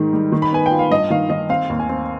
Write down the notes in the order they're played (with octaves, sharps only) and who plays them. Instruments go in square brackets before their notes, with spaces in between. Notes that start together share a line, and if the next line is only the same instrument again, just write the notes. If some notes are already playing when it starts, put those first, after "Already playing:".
Already playing: [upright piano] G#2 D#3
G3
D#3
B5
B3 G#5
G5
F4
F5
G2 D#5
D#3 F5
D#3 D#5
C4 F5
D#2
G#5
C4